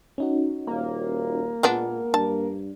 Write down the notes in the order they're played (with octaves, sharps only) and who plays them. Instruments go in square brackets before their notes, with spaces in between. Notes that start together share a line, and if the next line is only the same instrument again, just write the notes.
[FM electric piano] C#4 D#4 F#4
[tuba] D#1 [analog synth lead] A#3
[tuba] A#2 [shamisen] G#3 B3 D4
[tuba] G2 [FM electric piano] D4 [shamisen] A5